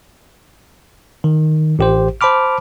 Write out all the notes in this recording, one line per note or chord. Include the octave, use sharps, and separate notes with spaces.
D#3
A1 G4 C5
C5 A5 B5 D6 F6